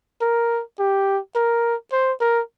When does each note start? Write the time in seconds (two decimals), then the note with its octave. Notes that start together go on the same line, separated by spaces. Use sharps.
0.22 A#4
0.79 G4
1.36 A#4
1.93 C5
2.21 A#4